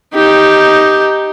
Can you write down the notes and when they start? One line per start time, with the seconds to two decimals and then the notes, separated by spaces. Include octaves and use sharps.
0.14 D#4 G4